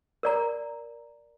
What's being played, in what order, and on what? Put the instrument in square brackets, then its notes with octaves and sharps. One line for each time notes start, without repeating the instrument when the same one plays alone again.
[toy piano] A#4 D5 A#5